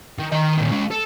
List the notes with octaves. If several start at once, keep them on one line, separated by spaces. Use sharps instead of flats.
D#3
D#3 D#5
A#2 D#3
G#3 F5
A4